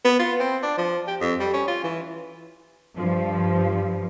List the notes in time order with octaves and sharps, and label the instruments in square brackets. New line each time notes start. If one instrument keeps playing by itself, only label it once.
[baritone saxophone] B3
F4
C4
D4
F3
G4
F2
G3
C#4
F4
E3
[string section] G2 F3